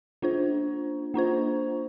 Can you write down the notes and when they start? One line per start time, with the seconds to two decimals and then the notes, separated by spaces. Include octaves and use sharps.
0.22 A#3 D4 F4 C5
1.14 A#3 D4 F4 C5